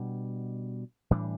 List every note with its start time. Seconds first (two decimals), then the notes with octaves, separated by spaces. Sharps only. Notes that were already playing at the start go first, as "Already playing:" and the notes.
Already playing: B2 G3 D4
1.11 A2 E3 G3 D4